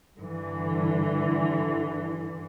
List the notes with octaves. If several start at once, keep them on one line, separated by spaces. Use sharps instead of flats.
G2 D3 E3